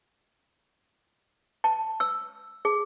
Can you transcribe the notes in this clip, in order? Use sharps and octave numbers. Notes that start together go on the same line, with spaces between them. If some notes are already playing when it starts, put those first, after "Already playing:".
A5
E6
G#4